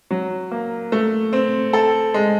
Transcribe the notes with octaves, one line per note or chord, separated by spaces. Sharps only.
F#3
A#3
A3
C4
A4
G#3